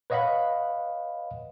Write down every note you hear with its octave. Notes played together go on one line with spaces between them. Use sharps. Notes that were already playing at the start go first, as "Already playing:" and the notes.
B4 C#5 D#5 F5 F#5 B5